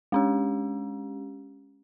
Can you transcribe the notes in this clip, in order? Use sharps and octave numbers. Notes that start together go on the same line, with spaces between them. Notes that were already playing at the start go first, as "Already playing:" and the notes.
G#3 C#4 G4